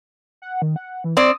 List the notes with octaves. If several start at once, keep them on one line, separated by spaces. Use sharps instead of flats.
F#5
D#3
F#5
E3
C4 D5 D#6